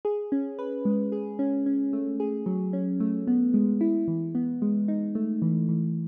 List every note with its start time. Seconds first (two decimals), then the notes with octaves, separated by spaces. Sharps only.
0.05 G#4
0.32 C#4
0.59 B4
0.85 G#3
1.12 G#4
1.39 C#4
1.66 C#4
1.93 A3
2.20 G#4
2.46 F#3
2.73 C#4
3.00 A3
3.27 B3
3.54 G#3
3.81 E4
4.08 E3
4.35 B3
4.62 G#3
4.88 D#4
5.15 A3
5.42 E3
5.69 E3